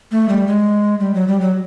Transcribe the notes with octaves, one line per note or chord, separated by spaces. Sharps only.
A3
G3
G#3
G3
F#3
G3
F#3